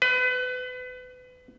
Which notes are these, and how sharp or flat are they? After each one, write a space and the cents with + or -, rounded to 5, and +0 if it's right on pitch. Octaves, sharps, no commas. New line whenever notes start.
B4 +30